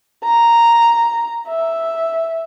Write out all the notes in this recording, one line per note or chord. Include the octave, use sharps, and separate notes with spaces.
A#5
E5